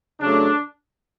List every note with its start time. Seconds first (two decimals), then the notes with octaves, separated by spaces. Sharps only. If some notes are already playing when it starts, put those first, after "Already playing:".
0.20 C#3 F#3 A3 D4